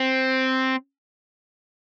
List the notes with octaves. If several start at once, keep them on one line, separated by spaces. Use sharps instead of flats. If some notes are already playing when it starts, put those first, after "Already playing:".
Already playing: C4